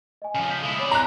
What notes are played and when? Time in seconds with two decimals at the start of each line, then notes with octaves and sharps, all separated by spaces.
0.22 D#5 G#5
0.35 C#3 F3 G#5
0.50 G6 B6
0.63 G#3 E4 D#6
0.80 C4 C#5 D5 B5
0.91 A#5 F#6